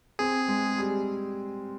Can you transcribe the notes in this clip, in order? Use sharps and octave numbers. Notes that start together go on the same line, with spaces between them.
C4 G#4
G#3
G3